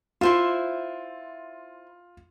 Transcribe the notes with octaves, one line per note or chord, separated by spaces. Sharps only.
E4 F4 C5 E5